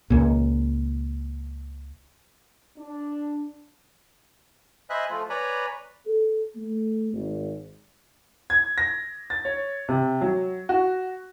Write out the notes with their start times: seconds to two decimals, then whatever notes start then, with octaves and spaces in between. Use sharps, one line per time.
0.10 C#2 A#2
2.77 D4
4.90 C5 D#5 E5 G#5 B5 F#6
5.10 F3 A3 F4
5.30 B4 C#5 D5 G#5 A#5 B5
6.05 A4
6.55 A3
7.13 G#1
8.50 G#6
8.78 A#6
9.30 A6
9.45 C#5
9.89 C3
10.21 F#3
10.69 F#4